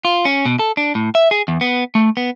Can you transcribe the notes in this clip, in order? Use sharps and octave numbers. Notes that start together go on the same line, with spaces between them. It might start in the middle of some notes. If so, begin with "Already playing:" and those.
F4
C#4
B2
A4
D4
A2
E5
G#4
E2
B3
A3
B3